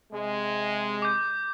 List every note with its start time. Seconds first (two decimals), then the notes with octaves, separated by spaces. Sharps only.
0.12 C3 G#3
1.02 D6 G6